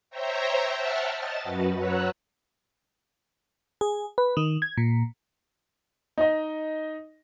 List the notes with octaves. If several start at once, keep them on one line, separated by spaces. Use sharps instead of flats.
C5 C#5 E5 G5 A#5
E5 F#5 G5 A5 F6
D#5 A5 A6
F#2 F#4 B4
B4 C#5 F#5 A#5 E6 F#6
G#4
B4
D#3
G#6
A#2
D#4 D#5